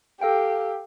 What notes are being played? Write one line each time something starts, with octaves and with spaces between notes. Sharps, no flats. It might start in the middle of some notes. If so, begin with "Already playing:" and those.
G4 A4 F5 G5